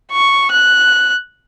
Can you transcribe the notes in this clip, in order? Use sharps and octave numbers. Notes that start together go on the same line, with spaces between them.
C#6
F#6